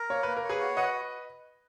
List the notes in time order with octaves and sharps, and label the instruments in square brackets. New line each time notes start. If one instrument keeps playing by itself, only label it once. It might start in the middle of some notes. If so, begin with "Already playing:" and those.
Already playing: [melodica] A#4
[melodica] A#3 [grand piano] C#5
[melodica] A#3 [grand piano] B4
[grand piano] A#4
[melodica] C#5
[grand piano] G#4 B4
[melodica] F#4
[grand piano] B4 D#5 [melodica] F#5